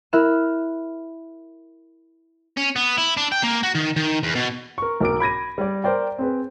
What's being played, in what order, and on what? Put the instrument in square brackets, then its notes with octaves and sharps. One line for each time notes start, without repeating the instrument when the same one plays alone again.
[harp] E4 A#4 E5 F6 F#6 E7
[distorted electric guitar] C#4
B3
E4
D4
G5
A#3
F#4
D#3
D#3
E2
B2
[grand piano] A#4 C#6
B1 A#4 D6 D7
B5 G#6 A#6 D#7
G3 D5
A#4 C5 D5 G5
C4 G#4 B4